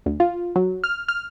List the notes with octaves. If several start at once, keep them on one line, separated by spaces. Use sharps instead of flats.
D2
F4
F#3
F6
F6